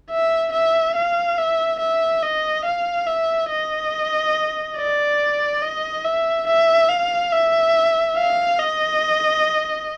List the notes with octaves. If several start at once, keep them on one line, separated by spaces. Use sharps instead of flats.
E5
E5
F5
E5
E5
D#5
F5
E5
D#5
D5
D#5
E5
E5
F5
E5
F5
D#5